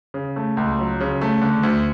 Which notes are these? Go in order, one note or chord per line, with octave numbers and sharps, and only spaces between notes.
C#3
A3
C#2
F#3
C#3
A3
D3
D2